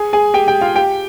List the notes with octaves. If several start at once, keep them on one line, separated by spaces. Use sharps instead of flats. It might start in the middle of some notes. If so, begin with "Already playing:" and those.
Already playing: G#4 G#5
G#4 G#5
G4 G5
G4 G5
F4 F5
G4 G5